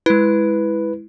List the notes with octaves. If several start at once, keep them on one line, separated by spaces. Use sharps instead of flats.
G#3 E4 B4